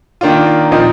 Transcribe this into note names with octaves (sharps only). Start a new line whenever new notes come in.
D#3 A#3 D4 F4
A#2 F3 C4 D#4